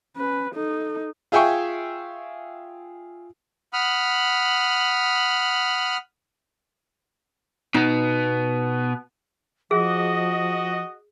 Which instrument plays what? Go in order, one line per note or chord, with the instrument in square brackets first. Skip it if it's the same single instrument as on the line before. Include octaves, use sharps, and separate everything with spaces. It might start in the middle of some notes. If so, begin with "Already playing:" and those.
[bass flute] C#4 [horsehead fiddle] B4
[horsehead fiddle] D#4 [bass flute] A4
[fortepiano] F4 G#4 E5 G5 G#5 C#6
[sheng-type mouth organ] F#5 B5 D#6 F6
[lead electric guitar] B2 B3 [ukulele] D#4
[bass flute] F3 [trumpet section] F#4 D#5 [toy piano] G#4